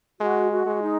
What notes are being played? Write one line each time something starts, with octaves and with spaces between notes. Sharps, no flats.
G#3 F#4
F#4
G#3
D#4